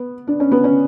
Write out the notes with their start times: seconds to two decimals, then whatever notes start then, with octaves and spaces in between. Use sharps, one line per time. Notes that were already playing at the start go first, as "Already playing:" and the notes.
Already playing: B3
0.27 D4
0.40 C#4
0.52 B3
0.64 C#4